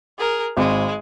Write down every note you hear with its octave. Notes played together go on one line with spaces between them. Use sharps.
G#4 A#4
G#1 G#3